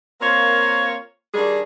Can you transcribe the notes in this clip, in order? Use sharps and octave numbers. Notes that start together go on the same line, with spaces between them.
A#3 C4 F4 A#4 C#5
D#3 G3 D4 G#4